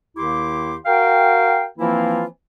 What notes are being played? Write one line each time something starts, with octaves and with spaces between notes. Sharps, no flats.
D#2 D#3 E4 G4 C6 D6
F#4 A#4 F5 G5
E3 F3 A#3 C4 E4 F4